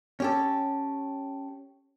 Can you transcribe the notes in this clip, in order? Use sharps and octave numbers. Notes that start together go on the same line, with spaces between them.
C#4 G4 A4